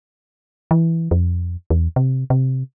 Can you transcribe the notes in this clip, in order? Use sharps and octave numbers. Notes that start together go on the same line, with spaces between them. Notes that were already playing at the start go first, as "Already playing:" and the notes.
E3
F2
E2
C3
C3